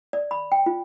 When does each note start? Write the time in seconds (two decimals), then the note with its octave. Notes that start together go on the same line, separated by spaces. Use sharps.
0.13 D5
0.31 B5
0.52 G5
0.66 F4